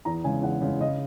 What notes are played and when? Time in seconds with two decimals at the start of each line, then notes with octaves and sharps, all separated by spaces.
0.05 E2 A#5
0.24 C#3 G#3 G#5
0.42 E2 F#5
0.62 C#3 G#3
0.80 C#3 D#5